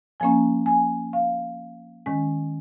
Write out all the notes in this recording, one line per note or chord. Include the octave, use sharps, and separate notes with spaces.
F3 A#3 C#4 G#5
G#5
F5
D#3 G#3 C#4